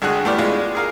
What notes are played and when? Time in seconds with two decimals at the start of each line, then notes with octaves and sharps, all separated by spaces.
0.02 C2 D3 G#3 F#4 G#4 F#6
0.25 A3 B3 E4 G4 D5 F6
0.38 G#3 D4 F4
0.75 G#4 A#4 F5